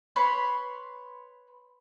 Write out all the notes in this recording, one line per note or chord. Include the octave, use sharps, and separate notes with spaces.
B4 C#5 B5 C6